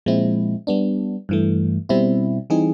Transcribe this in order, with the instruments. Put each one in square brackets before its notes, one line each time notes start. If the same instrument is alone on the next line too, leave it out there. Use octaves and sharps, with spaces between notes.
[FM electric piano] A#2 F3 G#3 C4 E4
G3 B3 D4
G2 E3 A3
B2 G3 C4 E4
E3 G3 C4 D#4 G#4